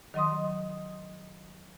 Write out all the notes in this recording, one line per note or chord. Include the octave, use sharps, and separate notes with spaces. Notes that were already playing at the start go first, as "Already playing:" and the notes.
D#3 F#3 D#5 C6 D#6